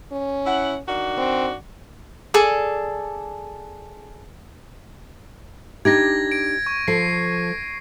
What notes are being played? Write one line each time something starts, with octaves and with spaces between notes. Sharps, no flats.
C#4
E4 F#5
D#3 D4 F#4
C4
G#4 A4 D5
D4 D#4 G4 G#6 A#6
D7
C#6
F3 A4 C7